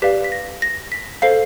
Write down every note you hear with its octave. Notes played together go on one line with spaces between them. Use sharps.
G4 B4 D5 F5 B6
B6
A#6
A#6
B6
A4 C5 F5 C7